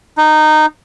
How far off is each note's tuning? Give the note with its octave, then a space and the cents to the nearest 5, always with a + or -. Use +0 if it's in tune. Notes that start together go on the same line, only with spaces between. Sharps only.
D#4 -15